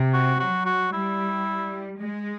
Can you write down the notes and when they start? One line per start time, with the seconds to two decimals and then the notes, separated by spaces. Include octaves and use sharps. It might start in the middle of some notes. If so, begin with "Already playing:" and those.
Already playing: C3
0.14 F#4
0.40 F#3 F#4
0.66 F#4
0.92 G3 E4
1.98 G#3